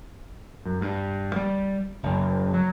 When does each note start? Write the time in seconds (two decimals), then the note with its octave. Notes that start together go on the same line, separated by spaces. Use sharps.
0.65 F#2
0.81 G2
1.36 G3
2.03 F#1
2.54 F#3